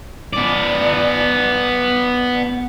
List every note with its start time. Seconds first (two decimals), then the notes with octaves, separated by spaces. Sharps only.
0.33 B3 D5